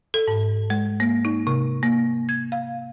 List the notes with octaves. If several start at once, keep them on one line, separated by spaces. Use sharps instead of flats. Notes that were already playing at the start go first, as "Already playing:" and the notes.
A4
G#2
G#3
A#3
D#4
C3
A#3
G#6
F5